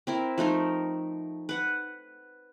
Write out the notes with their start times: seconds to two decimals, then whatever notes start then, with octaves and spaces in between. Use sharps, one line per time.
0.07 C4 E4 A#4
0.38 F3 A3 D#4 A#4
1.49 B4 F#5